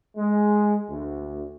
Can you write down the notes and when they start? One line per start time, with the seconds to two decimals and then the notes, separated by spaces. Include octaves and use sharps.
0.18 G#3
0.89 D2